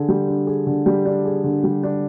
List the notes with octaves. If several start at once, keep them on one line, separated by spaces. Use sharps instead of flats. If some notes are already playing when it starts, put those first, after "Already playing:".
Already playing: D3 G#4
G3
D4
G#4
D3
G3
D4
G#4
D3
G3
D4